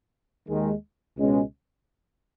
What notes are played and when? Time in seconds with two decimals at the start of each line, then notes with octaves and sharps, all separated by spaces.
0.49 D#2 D#3 G#3
1.16 C#2 B2 G#3 C#4